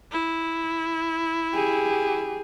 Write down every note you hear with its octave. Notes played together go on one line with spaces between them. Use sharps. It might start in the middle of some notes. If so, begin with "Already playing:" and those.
E4
G4 G#4